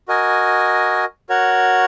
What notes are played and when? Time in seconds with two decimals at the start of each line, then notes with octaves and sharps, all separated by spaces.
0.08 F#4 A#4 D#5 G#5
1.29 F#4 A#4 C#5 F#5